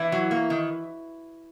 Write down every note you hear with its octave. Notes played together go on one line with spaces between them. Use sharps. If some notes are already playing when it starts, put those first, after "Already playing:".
Already playing: E3 E4
F#3
A#3
D#3